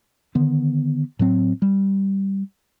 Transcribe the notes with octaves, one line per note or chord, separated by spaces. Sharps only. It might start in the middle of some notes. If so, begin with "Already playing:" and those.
D3 D#3 B3
A2 F#3 C4
G3